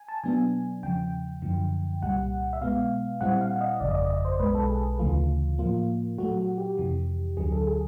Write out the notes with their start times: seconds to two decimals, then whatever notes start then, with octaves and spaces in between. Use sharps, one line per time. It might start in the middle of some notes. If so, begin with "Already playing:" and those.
Already playing: G#5
0.08 A5
0.24 B2 F#3 B3 D4 G#5
0.83 E2 C#3 F3 G5
1.42 F#2 D3 F3
2.02 C2 A#2 G3 F#5
2.53 E5
2.61 B2 G#3 B3 F5
3.21 A#2 G3 C4 E4 F#5
3.41 F5
3.61 D#5
3.80 G1 F2 C#3 D5
3.91 D#5
3.95 D5
4.10 D#5
4.25 C5
4.40 B1 B2 G#3 B4
4.55 A4
4.69 G#4
4.99 D2 C#3 E3 A3 F4
5.58 A2 F3 A#3 F4
6.18 A#2 F#3 A3 F#4
6.38 F#4
6.58 G4
6.77 F2 C3 E3
7.37 D2 D3 F#3 G#4
7.52 A4
7.67 G#4